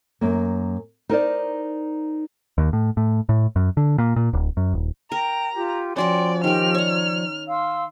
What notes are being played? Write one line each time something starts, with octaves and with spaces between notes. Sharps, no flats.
F#2 A#3
D#4 A#4 C5 D5
D#2
A2
A2
A2
F#2
D3
A#2
A#2
D1
F#2
D#1
A#4 G5 A#5
F4 G4
F3 C#4 F#4 D5 F#5 G5 C6
D#3 G4 A#4 C5 G5 F6
C#5 D5 A#5
F5 C6 E6